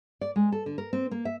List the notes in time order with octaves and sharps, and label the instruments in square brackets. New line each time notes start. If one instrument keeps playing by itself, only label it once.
[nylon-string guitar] D5
G#3
A4
D3
A#4
C4
A#3
E5